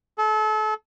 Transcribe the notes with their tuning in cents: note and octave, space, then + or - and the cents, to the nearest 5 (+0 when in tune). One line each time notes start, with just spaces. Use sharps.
A4 -35